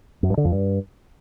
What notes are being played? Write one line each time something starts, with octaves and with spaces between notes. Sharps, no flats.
F#2
G2
D3
F2
G2